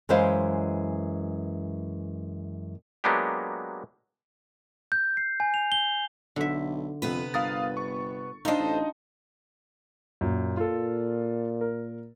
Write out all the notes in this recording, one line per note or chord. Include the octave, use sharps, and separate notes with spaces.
F#2 E3 G#3 C5 F5
F#3 G#3 A#3 B3 D4 G4
G6
C7
G#5
F7
G7
B1 D3 E5
F2 C3 B3 B4
G1 A#4 F5 D#6 A6
C#6
D4 D#4 F4 A4 C5 D#5
A1
F#2 A#2
A#2 F4 A4
A#4